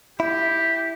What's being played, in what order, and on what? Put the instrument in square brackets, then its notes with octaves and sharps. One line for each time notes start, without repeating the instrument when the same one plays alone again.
[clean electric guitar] E4 [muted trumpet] G4